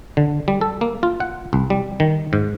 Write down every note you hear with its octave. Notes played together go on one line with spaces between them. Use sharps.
D3
G3
A4
A#3
F4
F#5
C2
G3
D#3
G#2